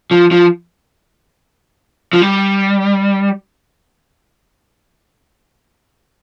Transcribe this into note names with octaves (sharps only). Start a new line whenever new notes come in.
F3
F3
F3
G3